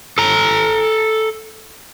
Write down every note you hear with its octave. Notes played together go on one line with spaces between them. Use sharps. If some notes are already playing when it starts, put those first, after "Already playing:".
A4 A#5